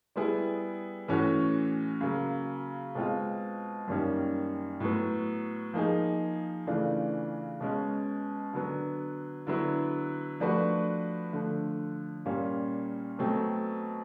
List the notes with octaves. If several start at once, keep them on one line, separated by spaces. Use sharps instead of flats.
G3 B3 E4 G#4
A2 E3 A3 C#4 F#4
C#3 F#3 A#3
B2 G#3 C4 F4
F#2 D#3 G3 A#3 C#4
A2 F#3 B3
F3 A#3 D#4 G#4
C#3 E3 A3 D4 F4
B2 G#3 C#4
D3 F#3 B3
D3 F#3 B3 E4
F3 A3 D4 F#4 B4
D3 F3 A3
A#2 G3 A#3 C#4
B2 F#3 A3 C4